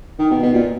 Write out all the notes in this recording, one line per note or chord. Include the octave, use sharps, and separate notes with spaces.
D#3
B2
B2
A#2